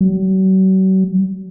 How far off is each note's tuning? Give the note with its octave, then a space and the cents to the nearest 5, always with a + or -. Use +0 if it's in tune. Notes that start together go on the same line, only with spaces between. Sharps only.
F#3 +40